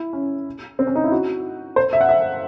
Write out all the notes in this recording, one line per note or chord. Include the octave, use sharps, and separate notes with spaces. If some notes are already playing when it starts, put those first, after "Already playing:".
Already playing: E4
C#4
C4
C#4
D#4
E4
F#4
C5
E5
F#5
E5